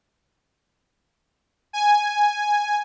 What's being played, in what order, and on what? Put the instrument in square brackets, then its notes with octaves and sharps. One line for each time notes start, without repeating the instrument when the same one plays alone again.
[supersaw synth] G#5